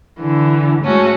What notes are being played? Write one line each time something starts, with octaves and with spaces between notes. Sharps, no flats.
D3 E3
G#2 A3 C#4 F#4